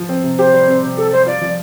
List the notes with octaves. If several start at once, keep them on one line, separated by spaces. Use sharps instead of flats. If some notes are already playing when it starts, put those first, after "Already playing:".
Already playing: F3
C4
C3
G4 C5
G3
C4
C3
G4 A4
G3 C5
F4 D5
F3